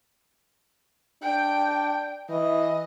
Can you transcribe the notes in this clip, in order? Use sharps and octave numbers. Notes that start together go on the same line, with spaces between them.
D4 G5
E3 D#5